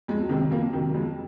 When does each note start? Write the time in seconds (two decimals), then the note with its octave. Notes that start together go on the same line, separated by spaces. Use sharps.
0.08 F2 G#3
0.21 F#3
0.29 C3 D#3 G#3
0.51 F2 A#3
0.73 C3 D#3 F#3
0.87 F#3
0.94 F2 G#3